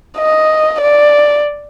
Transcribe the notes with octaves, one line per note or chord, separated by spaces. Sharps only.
D#5
D5